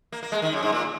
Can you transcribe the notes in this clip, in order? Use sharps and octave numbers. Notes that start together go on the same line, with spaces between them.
A#3
A#3
G#3
D#3
F#2
G#2
A#2